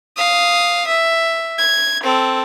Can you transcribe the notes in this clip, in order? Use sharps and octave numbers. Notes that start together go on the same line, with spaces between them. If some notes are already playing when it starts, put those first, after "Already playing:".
F5 D#6
E5
G#6
C4 A4